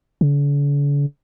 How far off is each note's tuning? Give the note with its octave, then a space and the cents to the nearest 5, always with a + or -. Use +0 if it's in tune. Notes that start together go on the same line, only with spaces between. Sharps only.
D3 -45